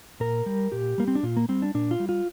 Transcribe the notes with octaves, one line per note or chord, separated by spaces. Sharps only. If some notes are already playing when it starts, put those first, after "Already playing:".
A#2 A#4
G3
A#2 G4
G3 A#3
C4
D4
A#2 F4
A#3
G3 C4
D4
A#2 D4
F4
G3
F4